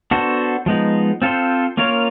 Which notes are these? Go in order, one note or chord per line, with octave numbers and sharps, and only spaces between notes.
B3 D4 F#4 A4 C5
F3 G#3 B3 D#4
C4 F4 A4 C5
A#3 C#4 F4 A#4 C#5